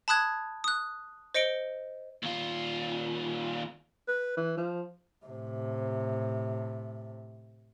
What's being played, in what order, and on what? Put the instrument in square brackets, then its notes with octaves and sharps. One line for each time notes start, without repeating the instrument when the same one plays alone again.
[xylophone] A5 B5 D#6 F#6 G#6
D#6 F#6
C5 D#5 C#7 D7 G7
[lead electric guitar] D#2 F4
[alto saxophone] B4
E3
F3
[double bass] A2 C3